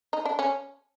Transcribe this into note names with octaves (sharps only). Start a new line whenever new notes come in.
D#4
D4
C#4